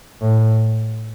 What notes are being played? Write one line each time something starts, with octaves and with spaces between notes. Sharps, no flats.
A2